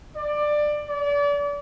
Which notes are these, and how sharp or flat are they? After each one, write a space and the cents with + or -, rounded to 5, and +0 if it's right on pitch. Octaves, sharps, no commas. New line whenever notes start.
D5 +15
D5 -35